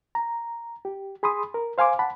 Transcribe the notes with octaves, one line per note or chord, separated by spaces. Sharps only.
A#5
G4
G#4 B5 C6 D#6
A#4
C5 F5 G#5 C6 D6
F#5 A5 B5